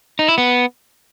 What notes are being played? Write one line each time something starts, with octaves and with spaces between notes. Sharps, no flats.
D#4
E4
B3